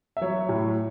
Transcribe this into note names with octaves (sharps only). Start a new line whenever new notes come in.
E5
F#3 C#5
A2